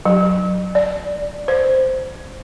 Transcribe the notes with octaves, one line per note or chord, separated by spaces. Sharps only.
F#3
D5
C5